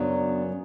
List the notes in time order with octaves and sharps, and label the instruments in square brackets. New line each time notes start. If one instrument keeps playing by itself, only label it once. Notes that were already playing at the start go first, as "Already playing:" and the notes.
Already playing: [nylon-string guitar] F#2 C#3 F#3 [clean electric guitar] B3 D4